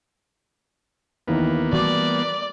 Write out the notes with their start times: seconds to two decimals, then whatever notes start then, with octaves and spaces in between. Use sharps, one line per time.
1.28 D#2 E3 A#3 B3 D#4
1.73 E3 G3 A3 F#4 D5 D6